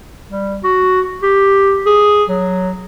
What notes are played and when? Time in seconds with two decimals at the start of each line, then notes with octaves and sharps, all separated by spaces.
0.30 G3
0.64 F#4
1.23 G4
1.86 G#4
2.29 F#3